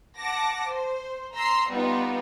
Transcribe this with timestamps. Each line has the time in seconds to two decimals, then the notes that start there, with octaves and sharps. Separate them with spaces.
0.17 F#5 A5 D6 A#6
0.70 C5
1.36 A#5 C6 E6 C7
1.71 G3 B3 D#4 F4